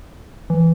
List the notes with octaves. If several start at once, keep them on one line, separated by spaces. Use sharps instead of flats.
E3